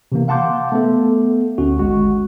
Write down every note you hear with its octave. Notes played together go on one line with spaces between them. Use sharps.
C3 E3 A#3
F5 F#5 A5 C6 D6 G6
A3 B3 A4
D2 C#4 F#4
G#1 G#3 F#4